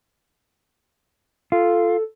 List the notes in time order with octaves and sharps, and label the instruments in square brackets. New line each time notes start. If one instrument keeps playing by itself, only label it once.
[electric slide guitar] F4 [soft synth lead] A4